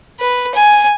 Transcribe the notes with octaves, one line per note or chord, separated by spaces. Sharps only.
B4
G#5